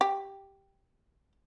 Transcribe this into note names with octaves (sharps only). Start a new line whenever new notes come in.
G4